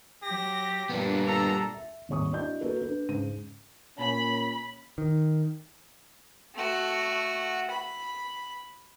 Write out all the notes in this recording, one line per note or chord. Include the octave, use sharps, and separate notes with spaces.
F#3 G4 A#6
A#2 G3 B3 D4
A4 A#5
E5
D#1 G#1 C#5 C#6 D#6
D4 E4 F#4 D5 D#5 G6
A#3 F#4 A4 B4
D4 B4
G#2 C#3 D#7
A#2 C#4 B5
D#3
A3 F#4
B5